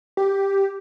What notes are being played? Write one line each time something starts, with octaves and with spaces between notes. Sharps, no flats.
G4